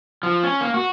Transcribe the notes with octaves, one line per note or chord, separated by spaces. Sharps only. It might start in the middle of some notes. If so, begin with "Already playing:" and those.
F3
C#4
A#3
F#4